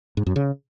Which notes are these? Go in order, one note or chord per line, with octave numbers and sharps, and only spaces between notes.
G#2
F#2
C#3